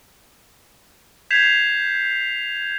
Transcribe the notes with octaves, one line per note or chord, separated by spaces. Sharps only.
G6 G#6 B6 C7 E7 F7